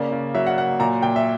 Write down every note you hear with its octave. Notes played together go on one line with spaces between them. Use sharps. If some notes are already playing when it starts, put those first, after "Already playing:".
Already playing: C#3 A#3 D5
C#3
F#3 E5
F#5
A#3 F#5
A#2 A#5
A#2 G5
E5